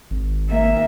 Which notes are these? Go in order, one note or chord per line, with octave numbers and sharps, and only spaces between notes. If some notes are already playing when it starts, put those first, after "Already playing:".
G#1
A#3 E5